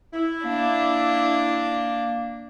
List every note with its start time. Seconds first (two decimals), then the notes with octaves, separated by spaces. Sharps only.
0.13 E4
0.45 A#3 D4